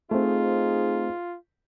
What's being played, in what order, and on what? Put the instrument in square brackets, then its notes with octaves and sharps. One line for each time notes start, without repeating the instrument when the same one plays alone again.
[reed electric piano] A3 C4 [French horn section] D#4 G#4 C5 [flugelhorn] F4